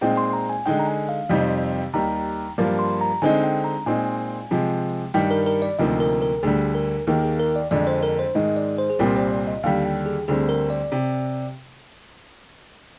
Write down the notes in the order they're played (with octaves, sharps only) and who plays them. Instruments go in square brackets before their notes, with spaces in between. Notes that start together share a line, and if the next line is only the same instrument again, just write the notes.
[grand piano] A#2 G#3 C4 D#4 [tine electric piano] G5
[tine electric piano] C6
A#5
G#5
[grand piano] D3 G#3 D#4 [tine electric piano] G5
[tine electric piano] A#5
G#5
F5
[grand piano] F2 C3 G3 C4 D#4
[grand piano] D#2 D#3 G3 [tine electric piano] A#5
[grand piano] G2 F3 A#3 F4
[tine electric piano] C6
A#5
[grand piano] D3 G#3 C4 D#4 [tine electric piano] G#5
[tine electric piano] G5
A#5
[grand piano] A#2 G#3 C4 D#4 [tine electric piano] G#5
[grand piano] C3 F3 G#3
[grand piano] G2 D#3 G3 [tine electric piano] G5
[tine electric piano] A#4
A#4
D5
[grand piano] D2 C3 F3 A#3 D#4 [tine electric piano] D#5
[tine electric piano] A#4
A#4
[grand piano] D2 D3 G3 [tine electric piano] G#4
[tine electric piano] A#4
[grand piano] D#2 D#3 A#3 [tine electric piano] G#4
[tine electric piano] G#4
A#4
D5
[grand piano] F2 D3 G#3 [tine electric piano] D5
[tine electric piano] C5
A#4
C5
[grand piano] G#2 D#3 G#3 [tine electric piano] D#5
[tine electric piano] D5
C5
G#4
[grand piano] C2 A#2 G3 C4 [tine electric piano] A#4
[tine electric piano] C5
D5
D#5
[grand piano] D#2 D3 G3 [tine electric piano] F5
[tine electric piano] G5
G#4
[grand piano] D2 D3 G3 C4 [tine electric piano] G#4
[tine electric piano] A#4
D5
[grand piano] C3